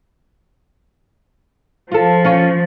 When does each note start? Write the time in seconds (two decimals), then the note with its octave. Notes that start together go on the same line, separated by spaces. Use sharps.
1.92 F3 F4 A4
2.25 C#4 F4 C#5